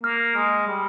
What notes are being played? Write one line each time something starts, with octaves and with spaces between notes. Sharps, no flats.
A#3 F6
G#3
G3